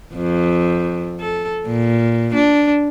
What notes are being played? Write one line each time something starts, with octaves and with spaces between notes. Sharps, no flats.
F2
A4
A#2
D4